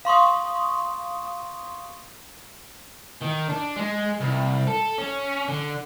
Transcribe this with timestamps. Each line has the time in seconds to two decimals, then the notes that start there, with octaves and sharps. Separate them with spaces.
0.05 F5 C6 C#6 D#6
3.21 D#3
3.49 D4
3.77 G#3
4.21 C2
4.67 A4
4.98 C#4
5.48 D3